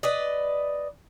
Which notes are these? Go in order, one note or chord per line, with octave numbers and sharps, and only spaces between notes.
B4 D5 D#5